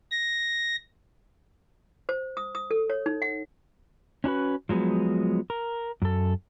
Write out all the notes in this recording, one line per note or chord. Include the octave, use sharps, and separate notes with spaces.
A#6
C5
D#6
D#6
A4
C#5
D#4
F#5
C#4 D4 F#4 B4
F3 F#3 G#3 B3
A#4
F#2 A4